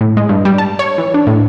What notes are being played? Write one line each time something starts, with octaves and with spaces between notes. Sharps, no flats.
A2
G#3
G2
G3
A5
C#5
E3
D4
A2